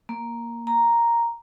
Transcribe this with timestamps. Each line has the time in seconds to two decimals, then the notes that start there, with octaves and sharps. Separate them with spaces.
0.09 A#3
0.67 A#5